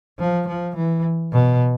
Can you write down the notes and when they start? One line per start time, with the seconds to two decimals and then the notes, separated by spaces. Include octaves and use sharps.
0.19 F3
0.48 F3
0.76 E3
1.33 B2